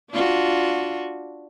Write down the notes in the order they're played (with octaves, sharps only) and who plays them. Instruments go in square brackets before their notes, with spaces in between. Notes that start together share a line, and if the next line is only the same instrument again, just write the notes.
[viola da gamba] D4 F4 F#4